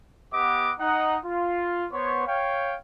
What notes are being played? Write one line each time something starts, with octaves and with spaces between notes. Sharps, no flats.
B3 G4 B4 D#5 F#5 D6
D#4 F#5
F4
B3 C5 C#5
C#5 F5 G5